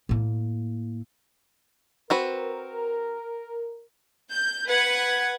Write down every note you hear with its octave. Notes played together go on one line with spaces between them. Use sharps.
A2 A#3
C4 F#4 A#4 B4
G6
B4 F#5 G#6